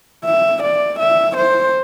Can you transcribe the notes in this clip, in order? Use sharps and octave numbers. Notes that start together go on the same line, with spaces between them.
E5
D5
E5
C5